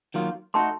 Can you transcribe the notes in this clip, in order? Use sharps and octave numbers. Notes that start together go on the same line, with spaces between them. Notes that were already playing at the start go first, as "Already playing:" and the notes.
D#3 F#3 A#3 F4
A3 D#4 F#4 A5 C6